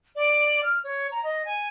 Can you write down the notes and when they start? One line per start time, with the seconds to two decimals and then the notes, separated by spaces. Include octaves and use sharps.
0.16 D5
0.63 F6
0.84 C#5
1.12 A#5
1.24 D#5
1.45 G#5